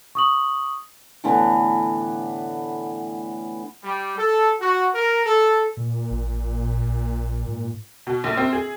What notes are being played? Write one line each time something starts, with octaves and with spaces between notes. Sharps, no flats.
C#6 D#6 F#7
A2 D3 E3 B3
G3
A4
F#4
A#4
A4
A#2
A1
A#1
G#2
B2
A#1
C4
G#4